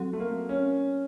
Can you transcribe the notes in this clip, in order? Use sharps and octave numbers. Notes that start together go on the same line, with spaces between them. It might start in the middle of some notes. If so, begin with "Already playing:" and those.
Already playing: F#3 C4 F#4 A4
A3
A#3
C#4